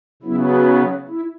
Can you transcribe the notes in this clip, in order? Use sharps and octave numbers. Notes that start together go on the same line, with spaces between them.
C#3 F#3 B3 E4
D#4
E4